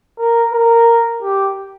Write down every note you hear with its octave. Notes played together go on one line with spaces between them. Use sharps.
A#4
A#4
G4